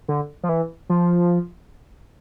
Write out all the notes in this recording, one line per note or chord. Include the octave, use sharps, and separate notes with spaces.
D3
F3
E3
F3